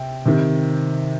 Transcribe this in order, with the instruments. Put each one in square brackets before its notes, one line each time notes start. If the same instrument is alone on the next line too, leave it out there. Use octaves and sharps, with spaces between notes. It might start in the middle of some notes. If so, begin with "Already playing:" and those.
Already playing: [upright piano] C3 G5
C3 D#3